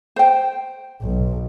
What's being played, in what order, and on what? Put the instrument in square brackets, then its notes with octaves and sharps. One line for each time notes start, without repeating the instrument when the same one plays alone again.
[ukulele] C5 G5
[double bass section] B1